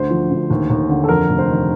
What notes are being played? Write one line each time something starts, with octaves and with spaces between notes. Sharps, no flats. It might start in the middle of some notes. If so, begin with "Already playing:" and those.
Already playing: D2 C5
F3
D2
D#2
D#2
D3
A4
F2 A#4
F1
C5
D#3